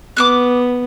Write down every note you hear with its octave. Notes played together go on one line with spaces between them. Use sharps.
B3 D6 F6 F#6